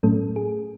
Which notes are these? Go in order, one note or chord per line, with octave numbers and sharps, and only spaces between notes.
A2 F#3 A3 C#4 A4
G#4